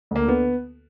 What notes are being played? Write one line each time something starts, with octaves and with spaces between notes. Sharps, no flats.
D2 A#3
D3 B3